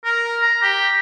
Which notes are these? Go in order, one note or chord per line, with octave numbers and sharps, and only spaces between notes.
A#4
A#5
G4